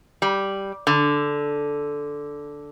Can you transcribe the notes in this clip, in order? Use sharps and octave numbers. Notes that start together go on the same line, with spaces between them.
G3
D3